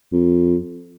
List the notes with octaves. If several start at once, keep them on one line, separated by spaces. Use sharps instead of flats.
F2